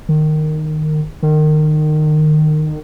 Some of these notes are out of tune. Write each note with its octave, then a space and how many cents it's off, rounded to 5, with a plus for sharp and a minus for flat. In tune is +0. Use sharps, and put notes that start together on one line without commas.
D#3 -15
D#3 -25